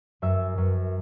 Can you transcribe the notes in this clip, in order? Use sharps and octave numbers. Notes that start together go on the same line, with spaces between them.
F#2 E5
F#2